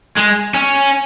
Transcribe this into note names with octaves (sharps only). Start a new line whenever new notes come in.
G#3
C#4